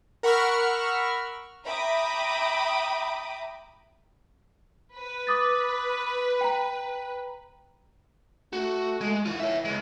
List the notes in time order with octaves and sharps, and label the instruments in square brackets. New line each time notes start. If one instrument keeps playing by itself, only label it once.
[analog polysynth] A#4 F#5 B5 C#6 E6 F6
[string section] E5 G5 A#5 B5 D6 D#6
[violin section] B4
[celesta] D6 D#6 A6
G5 A#5
[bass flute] A3 [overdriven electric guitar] F#4
[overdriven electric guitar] G#3
[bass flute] E3 [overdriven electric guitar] F4 F#5
[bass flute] E3 [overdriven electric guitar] C#5 E5
[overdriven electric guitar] C#3 G#3